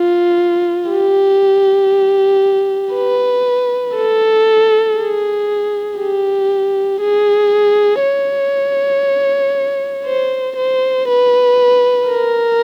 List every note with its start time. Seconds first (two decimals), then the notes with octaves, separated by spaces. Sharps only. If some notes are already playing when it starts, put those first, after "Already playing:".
Already playing: F4
0.90 G4
2.94 B4
3.95 A4
4.97 G#4
5.99 G4
7.01 G#4
8.02 C#5
10.06 C5
10.57 C5
11.08 B4
12.09 A#4